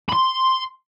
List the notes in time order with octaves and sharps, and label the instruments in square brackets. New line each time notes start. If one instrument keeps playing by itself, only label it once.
[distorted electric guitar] B5 C6